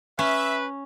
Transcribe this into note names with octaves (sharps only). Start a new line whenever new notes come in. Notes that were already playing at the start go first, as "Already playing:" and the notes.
C#4 B4 E5